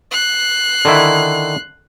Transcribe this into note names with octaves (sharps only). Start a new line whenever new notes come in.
F#6 C7
D3 D#3 E4